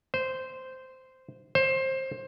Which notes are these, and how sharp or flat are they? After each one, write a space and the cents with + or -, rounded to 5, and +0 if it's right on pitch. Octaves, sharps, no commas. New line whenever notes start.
C5 -10
C5 +20